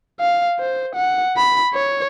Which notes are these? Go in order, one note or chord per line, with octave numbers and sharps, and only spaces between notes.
F5
C5
F#5
B5
C#5